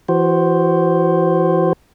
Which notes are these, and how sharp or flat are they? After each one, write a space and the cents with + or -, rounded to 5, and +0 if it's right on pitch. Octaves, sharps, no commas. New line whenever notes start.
E3 +30 F#4 +25 C5 +5